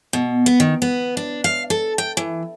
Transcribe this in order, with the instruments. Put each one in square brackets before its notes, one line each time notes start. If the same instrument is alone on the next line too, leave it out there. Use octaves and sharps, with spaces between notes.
[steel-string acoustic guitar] B2
B3
D#3
B3
D4
F5
A4
G5
E3